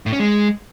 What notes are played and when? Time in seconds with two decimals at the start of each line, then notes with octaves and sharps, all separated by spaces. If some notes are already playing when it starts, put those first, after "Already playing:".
0.06 A2
0.13 C#4
0.19 G#3